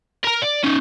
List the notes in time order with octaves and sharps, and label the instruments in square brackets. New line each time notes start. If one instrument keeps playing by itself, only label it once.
[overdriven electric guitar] A#4 A#5
D5
C#4 D#4